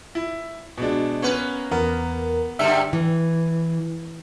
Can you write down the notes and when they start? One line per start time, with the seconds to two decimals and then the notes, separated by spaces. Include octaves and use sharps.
0.15 E4
0.78 B2 G#3 D4
1.22 A#3 B3 C#4 B4
1.71 E2 B3 A#4
2.59 G2 D3 G3 E5
2.93 E3